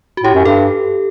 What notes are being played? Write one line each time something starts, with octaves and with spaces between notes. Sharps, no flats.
F#4
A2 G4
F#2
G2 A4